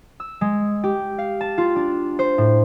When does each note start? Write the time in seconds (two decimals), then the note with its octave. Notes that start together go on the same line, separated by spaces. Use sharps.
0.20 E6
0.41 G#3
0.84 G4
1.18 F5
1.41 A5
1.58 F4
1.76 D4
2.19 C5
2.38 A2